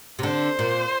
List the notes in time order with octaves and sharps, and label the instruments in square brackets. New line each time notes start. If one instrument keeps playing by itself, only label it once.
[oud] C3
[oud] D3 [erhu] C5
[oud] A#2